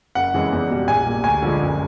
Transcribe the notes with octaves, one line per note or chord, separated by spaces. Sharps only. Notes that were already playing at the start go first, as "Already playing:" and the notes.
F#1 F#5
F2 C#3 E3 G#3
E2
B2 G3
A#1 G#5
A#2 G3
D2 G#5
D3 F3 G#3
F#1